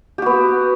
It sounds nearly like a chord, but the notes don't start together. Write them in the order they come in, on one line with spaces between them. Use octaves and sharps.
G4 F#4 B3